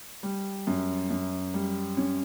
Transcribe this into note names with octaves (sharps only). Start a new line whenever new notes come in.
G3
F#2
F#2
G3
C#4